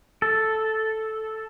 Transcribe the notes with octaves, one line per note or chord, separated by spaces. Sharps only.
A4